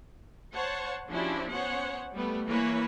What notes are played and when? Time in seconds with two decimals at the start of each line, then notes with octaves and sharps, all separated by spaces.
0.52 C5 C#5 F#5 A5
1.09 F3 C#4 D4 E4 F#4 G4
1.50 B3 C#4 C5 C#5 F#5
2.14 G3 A3 B3
2.48 E3 A#3 B4 C#5